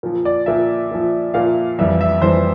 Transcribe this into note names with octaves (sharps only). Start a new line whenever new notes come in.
A#2 F3
D5
A#2 F3 E5
A#2 F3
A#2 F3 F5
F2 E3 G3 E5
E5
F2 E3 G3 C5